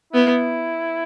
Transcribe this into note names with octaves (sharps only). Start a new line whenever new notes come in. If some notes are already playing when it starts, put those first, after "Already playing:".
B3 E4